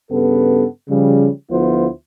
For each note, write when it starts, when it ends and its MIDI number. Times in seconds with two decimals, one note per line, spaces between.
0.11 0.65 43
0.11 0.65 49
0.11 0.65 59
0.11 0.65 69
0.89 1.28 49
0.89 1.28 53
0.89 1.28 55
1.51 1.87 38
1.51 1.87 53
1.51 1.87 59
1.51 1.87 64
1.51 1.87 65
1.51 1.87 72